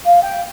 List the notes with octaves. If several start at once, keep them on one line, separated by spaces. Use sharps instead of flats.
F5
G5